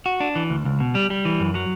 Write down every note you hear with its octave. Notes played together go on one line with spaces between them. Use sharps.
F#4
D4
E3
D2
C#2
B2
G3
G3
E3
F#2
F#3